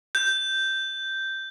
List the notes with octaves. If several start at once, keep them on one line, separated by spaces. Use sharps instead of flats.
G6